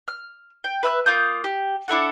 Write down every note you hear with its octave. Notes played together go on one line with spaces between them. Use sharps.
F6
G5
B4 E5 E6 F#6
A#3 F4 D#6 G6
G4
D4 E4 A4 F#5